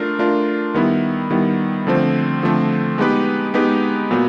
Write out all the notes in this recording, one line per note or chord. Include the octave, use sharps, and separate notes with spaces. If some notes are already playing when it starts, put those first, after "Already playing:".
Already playing: A3 D4 F4 A#4
A3 D4 F4 A#4
D#3 G3 B3 E4
D#3 G3 B3 E4
D3 F3 A3 C4
D3 F3 A3 C4
G#3 B3 D#4 G4 B4
G#3 B3 D#4 G4 B4
A#2 F#3 B3